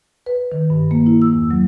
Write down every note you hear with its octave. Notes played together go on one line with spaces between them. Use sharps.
B4
D#3
G2
A#3
E4
E6
E2
F#3